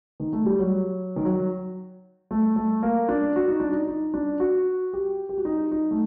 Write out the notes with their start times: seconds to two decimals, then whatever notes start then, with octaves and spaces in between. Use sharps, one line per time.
0.20 D#3
0.33 A3
0.46 G3
0.59 F#3
1.16 D#3
1.25 F#3
2.31 A3
2.56 A3
2.83 A#3
3.09 D4
3.36 F#4
3.48 D#4
3.60 D4
3.72 D#4
3.87 D#4
4.14 D4
4.40 F#4
4.94 G4
5.29 G4
5.38 F#4
5.45 D#4
5.72 D#4
5.91 A3